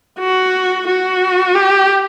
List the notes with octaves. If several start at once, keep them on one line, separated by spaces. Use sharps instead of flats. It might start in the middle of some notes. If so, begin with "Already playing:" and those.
F#4
F#4
G4